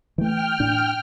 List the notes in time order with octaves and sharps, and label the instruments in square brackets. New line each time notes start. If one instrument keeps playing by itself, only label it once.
[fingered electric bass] E3 A3 [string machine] G5 F6
[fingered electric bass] A2 D4